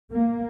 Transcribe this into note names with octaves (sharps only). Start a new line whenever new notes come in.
A#3